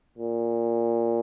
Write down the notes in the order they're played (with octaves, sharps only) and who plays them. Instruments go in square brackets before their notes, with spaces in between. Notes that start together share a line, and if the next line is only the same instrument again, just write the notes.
[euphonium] A#2